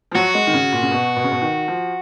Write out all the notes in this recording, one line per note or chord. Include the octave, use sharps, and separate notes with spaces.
F3
F#3 F#4
G#3
D#3
C#3
A#2
C#3
B2
B2
C#3
B2
D#3
F3